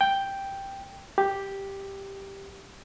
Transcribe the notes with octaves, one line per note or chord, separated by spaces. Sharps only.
G5
G4